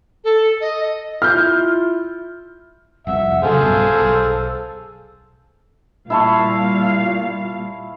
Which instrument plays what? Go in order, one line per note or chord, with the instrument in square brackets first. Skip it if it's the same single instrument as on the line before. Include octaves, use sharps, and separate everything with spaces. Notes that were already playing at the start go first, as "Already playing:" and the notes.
[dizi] A4
D#5
[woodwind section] E4 F4 [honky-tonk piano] F6 G6
[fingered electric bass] F1 C2 F2 [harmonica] E5 [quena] F#5
[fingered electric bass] A2 C#3 F#3 [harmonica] G#4 C5 F5 [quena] A4
[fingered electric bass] B1 G2 B2
B1
[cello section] A#2 G3 F5 [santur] E4 A5 C#6